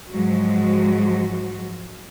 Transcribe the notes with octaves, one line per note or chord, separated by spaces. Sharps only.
G#2 F3 F#3 G#3 F#4